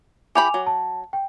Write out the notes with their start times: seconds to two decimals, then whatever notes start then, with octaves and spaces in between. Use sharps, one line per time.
0.35 E3 G4 G#5 B5 D6 F7
0.54 F#3
0.67 A5
1.13 G5